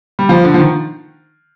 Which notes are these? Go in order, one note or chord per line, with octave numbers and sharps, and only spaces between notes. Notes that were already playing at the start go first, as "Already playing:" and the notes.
G3
F3
D3
F3
D#3